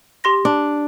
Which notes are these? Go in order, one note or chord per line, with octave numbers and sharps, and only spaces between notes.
G4 C6 A#6
D4